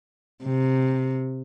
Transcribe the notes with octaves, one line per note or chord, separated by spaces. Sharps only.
C3